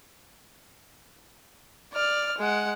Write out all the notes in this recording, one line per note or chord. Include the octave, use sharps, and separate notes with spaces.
D5 F6
G#3 F#5